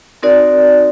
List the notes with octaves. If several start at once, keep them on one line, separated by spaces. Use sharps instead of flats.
C4 D#4 F#4 A#4 D5